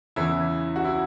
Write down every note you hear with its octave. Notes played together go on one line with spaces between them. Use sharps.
E2 C#3 E3 E4
F#4
E4